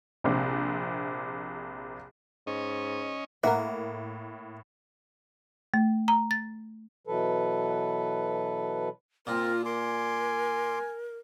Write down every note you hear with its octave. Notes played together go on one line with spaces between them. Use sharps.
A#1 C3
G#2 C#4 D#5
A2 A#3 A#4 E5 F#5
A3
A#5
A6
B2 E3 F#3 A4 B4
A#2 C4 F4 A#4
A#4 G#5 C6 D6